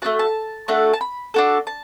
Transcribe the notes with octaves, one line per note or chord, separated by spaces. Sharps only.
A3 D4 F#4 A5
A5
A3 D4 F#4 A4
A5
B5
D4 F#4 A4
A5